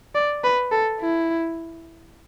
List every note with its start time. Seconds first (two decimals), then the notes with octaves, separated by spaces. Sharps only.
0.15 D5
0.44 B4
0.72 A4
1.00 E4